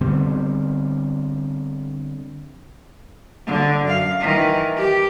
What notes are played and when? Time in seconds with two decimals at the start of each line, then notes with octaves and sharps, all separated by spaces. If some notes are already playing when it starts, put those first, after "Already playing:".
0.01 D3 G3 B3 C4
3.47 D3
3.85 F#2 F5
4.21 D#3 E3
4.77 G4